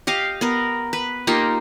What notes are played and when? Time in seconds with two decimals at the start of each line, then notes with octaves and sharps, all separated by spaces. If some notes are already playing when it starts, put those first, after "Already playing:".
0.07 G4 D#5 F5
0.41 B3 A#4
0.93 B4
1.27 A#3 D#4 F4 G4